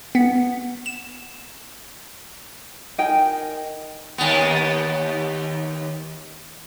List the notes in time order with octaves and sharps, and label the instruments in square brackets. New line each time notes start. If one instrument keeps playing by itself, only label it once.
[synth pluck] B3
E7
[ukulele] D#4 A#4 G5 G#5
[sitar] D#2 B3